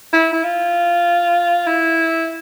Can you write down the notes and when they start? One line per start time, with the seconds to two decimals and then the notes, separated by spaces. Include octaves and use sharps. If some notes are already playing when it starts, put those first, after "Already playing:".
0.13 E4
0.33 E4
0.43 F4
1.66 E4